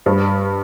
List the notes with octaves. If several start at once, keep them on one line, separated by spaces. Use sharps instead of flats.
G2